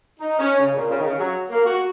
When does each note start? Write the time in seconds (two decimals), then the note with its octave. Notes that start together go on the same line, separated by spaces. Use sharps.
0.19 D#4
0.39 C#4
0.59 C#3
0.74 A#2
0.89 C#3
0.99 D#3
1.05 C#3
1.19 F#3
1.50 A#3
1.65 F#4